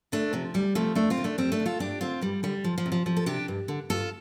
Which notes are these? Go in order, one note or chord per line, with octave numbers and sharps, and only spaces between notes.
D2 A3 D4
C3 F3
D2 G3
C3 F3 A3
F2 A3 D4
C4 F4
D3
A3 D4
F2 G3 C4
A3 D4
D3
F4 A4
G2 D4 G4
D3 C4 F4
G2 G3
D3 G3
F2 F3
F3
C3
F3
F2 F3
A4
C3 D4 G4
G2
D3
G2 F4 A4